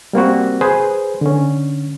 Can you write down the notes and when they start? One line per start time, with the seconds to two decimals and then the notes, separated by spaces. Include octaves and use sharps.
0.13 G3 A#3 C4 F#4
0.61 G#4 B4 C5
1.21 D3 C#4